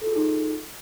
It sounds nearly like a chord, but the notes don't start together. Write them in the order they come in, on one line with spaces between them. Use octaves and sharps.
A4 F4 G#4 D#4